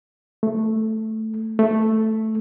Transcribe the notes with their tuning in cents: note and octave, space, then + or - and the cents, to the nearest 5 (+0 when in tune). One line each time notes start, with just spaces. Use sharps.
A3 +0
A3 +0